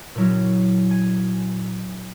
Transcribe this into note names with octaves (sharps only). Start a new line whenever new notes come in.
A#2 F#3 C#4 E4
G#5